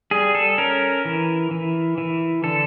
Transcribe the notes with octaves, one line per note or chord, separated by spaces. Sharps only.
G3 G#4
A4
C#4 A#4
E3
E3
E3
D3 A4